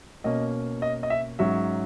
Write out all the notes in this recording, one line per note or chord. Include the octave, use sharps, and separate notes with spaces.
B2 A#3 C#4 D#5
D#5
D#5
E5
G#2 F#3 C#4 E5